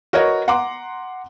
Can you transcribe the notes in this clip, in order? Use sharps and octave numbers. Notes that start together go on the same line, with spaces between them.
F#4 A#4 B4 C#5 D#5
F#5 A#5 C6 D6